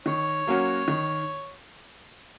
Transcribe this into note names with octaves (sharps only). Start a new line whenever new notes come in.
D#3 C#5
F#3 A#3 C#4 F#4
D#3